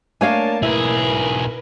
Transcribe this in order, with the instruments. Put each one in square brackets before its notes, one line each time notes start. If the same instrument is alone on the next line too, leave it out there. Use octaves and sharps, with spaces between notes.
[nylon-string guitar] A3 A#3 G#5 [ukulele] D4 C#5 F5 [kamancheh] A#4 A5
[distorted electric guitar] B1 G#4 [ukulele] E4 [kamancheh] A#4 B4